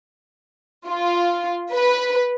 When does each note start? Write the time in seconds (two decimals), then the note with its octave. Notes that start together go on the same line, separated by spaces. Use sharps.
0.87 F4
1.72 B4